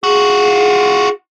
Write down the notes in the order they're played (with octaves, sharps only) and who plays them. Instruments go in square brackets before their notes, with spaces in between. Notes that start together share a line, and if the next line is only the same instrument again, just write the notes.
[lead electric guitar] F4 F#4 [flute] G#4